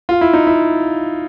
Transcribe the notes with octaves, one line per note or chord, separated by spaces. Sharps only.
F4
E4
D#4
E4